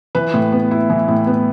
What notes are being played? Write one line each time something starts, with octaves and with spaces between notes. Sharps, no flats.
E3 B4
A2
B3
E4
E3
A2
B3